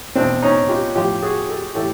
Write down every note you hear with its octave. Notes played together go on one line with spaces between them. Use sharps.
E2 B2 C4 D4
C#4 D#4
F4 G4
A2 F3 F4 G4
F#4 G#4
G4 A4
A2 E3 G4 A4